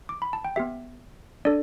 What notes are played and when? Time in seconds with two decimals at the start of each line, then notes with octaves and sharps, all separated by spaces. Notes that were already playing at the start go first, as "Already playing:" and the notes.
0.09 D6
0.22 B5
0.33 A5
0.45 G5
0.56 B3 G4 E5
1.45 D4 A4 D5